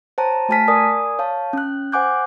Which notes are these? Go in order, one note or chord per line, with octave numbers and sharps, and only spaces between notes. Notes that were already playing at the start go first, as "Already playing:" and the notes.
C5 C#5 G5 A5 A#5
A3 F#4 G#5 A5 F6 B6
A#4 D5 G#5 D#6
C#5 F5 A5
C#4 F#6
C5 F#5 G#5 D6 F#6 G6